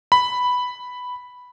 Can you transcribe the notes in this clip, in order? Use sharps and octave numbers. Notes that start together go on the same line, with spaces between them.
B5